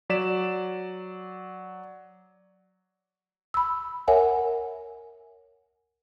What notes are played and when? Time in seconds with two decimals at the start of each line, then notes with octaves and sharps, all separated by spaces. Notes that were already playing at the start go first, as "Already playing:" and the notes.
0.10 F#3 D5 B6 E7
3.54 B5 E6
4.08 A#4 C#5 E5 F#5 G#5